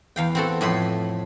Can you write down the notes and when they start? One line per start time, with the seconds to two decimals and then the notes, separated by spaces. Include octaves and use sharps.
0.16 E2 F5 G5
0.35 C4 F#4 A4
0.61 F2 A2 B5 C6